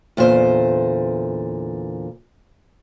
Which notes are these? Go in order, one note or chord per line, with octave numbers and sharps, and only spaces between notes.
E2 A#2 D3 C5